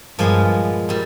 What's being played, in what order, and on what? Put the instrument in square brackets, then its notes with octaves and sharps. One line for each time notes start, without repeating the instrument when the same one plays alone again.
[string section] G2 [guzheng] A#2 F3 G#3 B3
[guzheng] A#2 G3